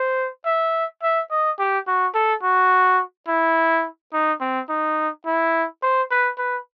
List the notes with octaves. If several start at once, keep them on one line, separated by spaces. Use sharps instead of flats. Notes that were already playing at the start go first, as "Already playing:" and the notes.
Already playing: C5
E5
E5
D#5
G4
F#4
A4
F#4
E4
D#4
C4
D#4
E4
C5
B4
B4